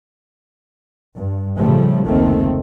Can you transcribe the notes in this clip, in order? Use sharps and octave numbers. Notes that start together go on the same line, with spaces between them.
G2
A2 C#3 F3 G3 A3
F1 C#2 D#3 A3 A#3 C4